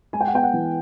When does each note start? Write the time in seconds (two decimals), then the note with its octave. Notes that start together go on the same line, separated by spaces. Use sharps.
0.13 G#3 G#5
0.21 G5
0.27 F#5
0.33 B3 G5
0.43 F#5
0.53 E3